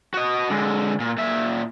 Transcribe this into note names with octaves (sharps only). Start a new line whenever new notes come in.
F#4 D#5
D3 G#3
A#2
A#2 E5